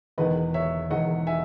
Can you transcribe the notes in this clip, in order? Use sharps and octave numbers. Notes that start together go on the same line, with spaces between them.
E1 E2 D#3 B4 D#5
C#5 E5
E1 E2 D#3 D#5 F#5
E5 G#5